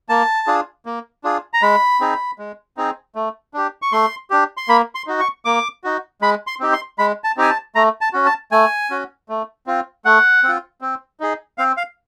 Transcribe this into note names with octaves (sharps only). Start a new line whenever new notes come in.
A#3 A5
D4 F4 G#4
A#3
D4 F4 G#4
A#5
G#3 B5
C4 D#4 G#4
G#3
C4 D#4 G#4
A3
D4 G4
C#6
A3 C6
D4 G4
C6
A#3 B5
C6
D#4 F#4
C#6
A#3 D6
D#4 F#4
G#3 B5
C6
C4 D#4 G4
C6
G#3 B5
A5
C4 D#4 G4 G#5
A5
A3 A#5
A5
C#4 F#4
A5
A3 G#5
C#4 F#4
A3
C4 F4
A3 F#5
C4 F4
C4
D#4 G#4
C4 F5
F5